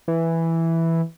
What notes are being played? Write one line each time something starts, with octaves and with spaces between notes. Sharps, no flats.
E3